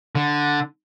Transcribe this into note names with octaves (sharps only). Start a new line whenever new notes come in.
D3